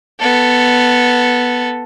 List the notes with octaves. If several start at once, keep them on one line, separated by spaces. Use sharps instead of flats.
B3 A4